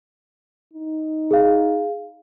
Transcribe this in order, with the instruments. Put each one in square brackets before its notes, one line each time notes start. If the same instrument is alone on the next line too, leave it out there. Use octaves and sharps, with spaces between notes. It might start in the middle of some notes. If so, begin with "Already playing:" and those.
[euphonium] D#4
[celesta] G#4 F5